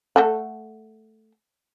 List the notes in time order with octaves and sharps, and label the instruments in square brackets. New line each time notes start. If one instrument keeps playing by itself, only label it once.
[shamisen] A3 A4 F#5